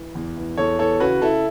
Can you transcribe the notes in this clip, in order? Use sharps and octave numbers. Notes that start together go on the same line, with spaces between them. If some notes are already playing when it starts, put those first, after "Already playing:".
Already playing: E3
E2
E3
E2 A4 C#5
E3 A4 C#5
C#3 F#4 B4
C#3 E4 A4